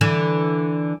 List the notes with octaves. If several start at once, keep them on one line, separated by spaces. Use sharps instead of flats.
D3 E3